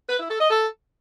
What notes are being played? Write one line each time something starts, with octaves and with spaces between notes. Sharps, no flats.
B4
E4
A4
D#5
A4